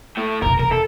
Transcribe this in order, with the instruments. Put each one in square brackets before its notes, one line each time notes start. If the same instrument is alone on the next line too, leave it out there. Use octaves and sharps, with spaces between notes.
[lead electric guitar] A2 A3
[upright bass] F1 B2 [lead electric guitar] A#4
[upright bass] E1 E2 [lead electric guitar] A#4
[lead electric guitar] A4